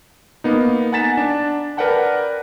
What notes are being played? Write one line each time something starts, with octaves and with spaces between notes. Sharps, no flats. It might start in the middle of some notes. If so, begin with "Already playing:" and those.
A#3 B3 D#4
F#5 G#5 A#5 A6 B6 E7
D4
A#4 B4 D5 F#5 G5 A5